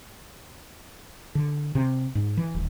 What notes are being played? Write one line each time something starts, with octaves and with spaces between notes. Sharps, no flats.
D3
C3
G#2
E3
D#1